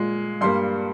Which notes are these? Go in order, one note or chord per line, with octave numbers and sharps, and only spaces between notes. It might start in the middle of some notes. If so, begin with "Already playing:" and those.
Already playing: A#2 G#3
G2 G3 A#3 C6